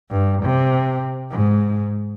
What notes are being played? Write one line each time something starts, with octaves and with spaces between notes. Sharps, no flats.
G2
C3
G#2